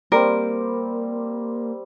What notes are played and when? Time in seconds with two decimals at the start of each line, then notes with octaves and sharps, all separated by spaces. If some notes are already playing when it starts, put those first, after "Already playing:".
0.12 G3 A#3 C4 A#4